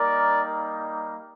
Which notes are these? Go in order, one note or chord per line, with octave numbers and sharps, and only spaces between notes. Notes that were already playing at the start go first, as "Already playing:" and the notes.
Already playing: G3 A#3 D#4 A#4 D5